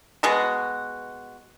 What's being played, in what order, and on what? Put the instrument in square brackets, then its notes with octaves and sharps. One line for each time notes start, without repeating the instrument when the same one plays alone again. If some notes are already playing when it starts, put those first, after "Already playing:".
[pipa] B2 G#3 F#4